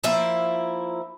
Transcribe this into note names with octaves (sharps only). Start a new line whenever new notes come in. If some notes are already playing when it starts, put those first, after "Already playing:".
F3 A#3 E4 E5